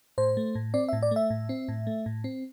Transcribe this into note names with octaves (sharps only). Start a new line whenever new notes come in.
A2 C5
A3
A2
C4 D5
A2 E5
D5
A3 E5
A2
C4
A2
A3
A2
C4